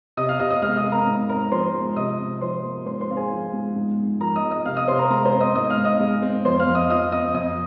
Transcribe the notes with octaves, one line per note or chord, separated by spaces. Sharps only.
C3 D#5 D#6
F5 F6
C3 D#5 D#6
D#5 D#6
G#3 F5 F6
D#5 D#6
C4
A#4 A#5
G#2
C4 A#4 A#5
F3 C5 C6
G#3
C3 D#5 D#6
C3
F3 C5 C6
A#3
G#2 C5 C6
C5 C6
C4 F5
G#4 G#5
F3
G#3
G#2
G#2
F3 A#4 A#5
D#5 D#6
G#3
D#5 D#6
C3 F5 F6
D#5 D#6
C3 C5 C6
A#4 A#5
G#3 A#4 A#5
C5 C6
C4
D#5 D#6
G#2 D#5 D#6
F5 F6
G#2
D#5 D#6
G#3
C4
F2 C5 C6
F5 F6
F2
D#5 D#6
F3 D#5 D#6
C4 D#5 D#6
F2 D#5 D#6